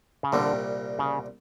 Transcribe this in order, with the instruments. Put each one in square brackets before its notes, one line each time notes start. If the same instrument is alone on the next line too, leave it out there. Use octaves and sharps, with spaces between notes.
[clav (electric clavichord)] C#3
[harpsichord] C2 A#2 G3 [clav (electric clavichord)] D3
[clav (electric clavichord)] C#3